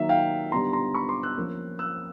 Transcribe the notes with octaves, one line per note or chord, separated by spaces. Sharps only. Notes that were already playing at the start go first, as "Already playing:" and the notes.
Already playing: D#3 F#3 A#3 D#4 E5
F5 G5
D3 G3 B3 D#4 A#5 C6
A#5 C6
B5 C#6
C6 D6
E6 F#6
F3 A#3 C#4
E6 F#6